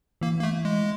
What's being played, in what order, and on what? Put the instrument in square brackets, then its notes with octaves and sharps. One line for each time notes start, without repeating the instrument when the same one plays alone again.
[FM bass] E3 [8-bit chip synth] A#3
[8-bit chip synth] A#3
A3
G#3